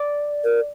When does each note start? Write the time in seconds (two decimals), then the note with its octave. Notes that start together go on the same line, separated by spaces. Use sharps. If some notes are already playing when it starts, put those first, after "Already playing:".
Already playing: D5
0.44 A#4